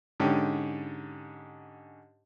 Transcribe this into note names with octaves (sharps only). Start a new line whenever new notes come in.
G#2 D3 C#4 G4